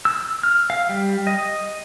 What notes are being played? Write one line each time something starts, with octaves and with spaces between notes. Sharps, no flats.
E6
F6
F5
G3
D#5